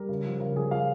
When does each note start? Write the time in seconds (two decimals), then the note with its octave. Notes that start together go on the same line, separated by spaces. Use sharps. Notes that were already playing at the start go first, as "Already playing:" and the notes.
Already playing: G3 A#4
0.09 C#3
0.25 F3
0.40 C#3 A#4
0.56 F3 G#4
0.71 F3 F5